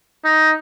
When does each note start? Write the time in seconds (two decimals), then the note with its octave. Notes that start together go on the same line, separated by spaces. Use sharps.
0.25 D#4